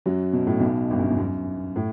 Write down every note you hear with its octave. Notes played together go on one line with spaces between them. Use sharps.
F#2 F#3
B2
A2
B1 B2
G1 G2
F#2
E2
F#2
A2